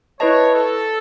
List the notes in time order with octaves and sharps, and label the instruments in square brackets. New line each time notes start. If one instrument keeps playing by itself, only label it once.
[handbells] E4 B4 D#5 A5 [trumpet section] C#5
[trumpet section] A4